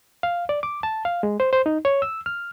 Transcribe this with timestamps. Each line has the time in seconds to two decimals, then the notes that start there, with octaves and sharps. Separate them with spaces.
0.23 F5
0.49 D5
0.63 D6
0.83 A5
1.05 F5
1.23 G#3
1.40 C5
1.53 C5
1.66 D#4
1.85 C#5
2.02 E6
2.26 F6